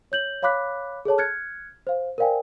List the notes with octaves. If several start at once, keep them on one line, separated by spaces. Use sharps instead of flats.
C#5 G6 F#7
C#5 F5 B5 D6 F#6 B6
G#4 A4 C#5 A5
F6 F#6 G#6 A6 C#7
C5 F5
A#4 C5 D5 F5 G5 G#5